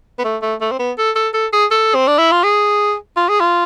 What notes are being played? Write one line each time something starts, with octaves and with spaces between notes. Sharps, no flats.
B3
A3
A3
A3
C4
B3
A4
A4
A4
G#4
A4
C4
D4
E4
F4
G#4
F4
G#4
F4